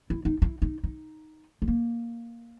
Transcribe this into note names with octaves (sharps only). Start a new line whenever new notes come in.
E4
D#4
E4
D#4
D#4
G#3
A#3